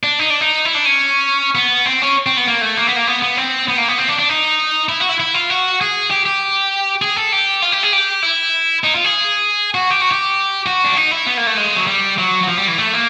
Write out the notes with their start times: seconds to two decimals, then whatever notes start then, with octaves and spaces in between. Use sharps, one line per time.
0.03 D4
0.19 D#4
0.30 D4
0.41 D#4
0.65 E4
0.75 D4
0.85 C#4
1.55 B3
1.86 C4
2.02 C#4
2.26 C4
2.37 B3
2.47 A#3
2.61 A3
2.77 A#3
2.87 B3
2.96 A#3
3.07 B3
3.22 B3
3.37 C4
3.68 B3
3.78 A#3
3.88 B3
3.98 C4
4.08 D4
4.19 D4
4.29 D#4
4.89 E4
5.00 F#4
5.09 E4
5.20 E4
5.34 F4
5.50 F#4
5.81 G#4
6.11 G4
6.26 G4
7.02 G#4
7.16 A4
7.32 G4
7.62 F4
7.72 G4
7.83 G#4
7.93 G4
8.23 E4
8.84 D#4
8.94 F4
9.04 G#4
9.75 F#4
9.90 G4
10.01 F#4
10.11 G4
10.66 F#4
10.84 D4
10.97 D#4
11.11 E4
11.27 B3
11.37 A#3
11.47 A3
11.57 G#3
11.76 F#3
11.87 G3
12.18 F#3
12.43 F#3
12.48 F3
12.57 G3
12.68 E3
12.78 A3
12.93 A#3